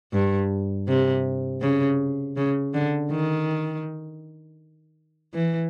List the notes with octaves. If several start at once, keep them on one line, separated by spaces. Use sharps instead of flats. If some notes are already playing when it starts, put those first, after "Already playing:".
G2
C3
C#3
C#3
D3
D#3
E3